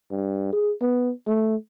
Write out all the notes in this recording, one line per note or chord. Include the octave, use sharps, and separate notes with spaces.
G2
G#4
B3
A3